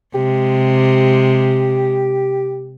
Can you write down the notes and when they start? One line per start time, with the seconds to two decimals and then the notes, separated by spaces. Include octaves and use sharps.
0.15 C3 G#3 G4